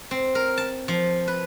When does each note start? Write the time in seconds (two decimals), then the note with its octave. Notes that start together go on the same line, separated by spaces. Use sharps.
0.11 C4
0.35 A#4
0.58 A5
0.88 F3
1.28 B4